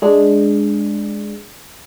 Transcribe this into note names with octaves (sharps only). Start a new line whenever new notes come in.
G#3 D4 G#4